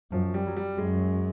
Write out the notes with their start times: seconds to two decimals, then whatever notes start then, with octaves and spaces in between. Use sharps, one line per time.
0.12 F#2 F3
0.34 G3
0.47 F#3
0.57 G3
0.78 F#2 G#3